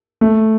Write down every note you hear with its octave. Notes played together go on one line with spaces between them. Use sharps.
A3